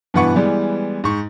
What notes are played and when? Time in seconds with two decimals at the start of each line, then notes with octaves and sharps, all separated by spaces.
0.14 G2 B2 E3 B4 F#5 C#6
0.35 E3 G3 G#3 B3
1.04 G#2 C#6